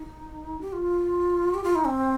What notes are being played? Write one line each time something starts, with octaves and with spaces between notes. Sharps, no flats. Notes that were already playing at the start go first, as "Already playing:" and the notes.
Already playing: D#4
G4
F4
G4
F4
D#4
C4